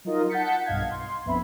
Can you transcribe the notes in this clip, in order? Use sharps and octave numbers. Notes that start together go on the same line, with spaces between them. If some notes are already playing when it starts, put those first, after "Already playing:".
F#3 D#4 F4 A#4 D#5
F#5 A5 G6 A6 B6 C#7
B1 G2 D#5 F5 G#6
C6
A#1 F2 B3 E5 B5